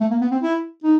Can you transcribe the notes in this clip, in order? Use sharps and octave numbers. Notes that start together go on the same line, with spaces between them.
A3
A#3
B3
C4
E4
D#4